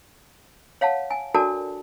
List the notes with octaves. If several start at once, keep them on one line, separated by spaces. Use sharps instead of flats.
C#5 F5 F#5 A5
G#5
D4 F#4 A4 A#4 D5 A5